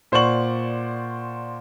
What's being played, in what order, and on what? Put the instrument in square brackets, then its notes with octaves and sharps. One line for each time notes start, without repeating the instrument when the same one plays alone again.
[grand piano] A#2 C5 D5 F#5 C#6 F#7